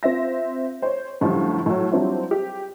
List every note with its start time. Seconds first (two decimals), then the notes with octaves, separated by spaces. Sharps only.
0.03 C4 F4 E5 A#6
0.82 C5 C#5
1.21 F#2 A2 D3 F3 G3 F4
1.66 A2 F#3
1.91 F#3 G3 C4 D4 E4 F4
2.31 G4